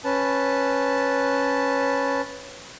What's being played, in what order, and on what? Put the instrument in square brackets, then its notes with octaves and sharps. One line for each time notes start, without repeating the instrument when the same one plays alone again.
[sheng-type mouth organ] C#4 B4 A5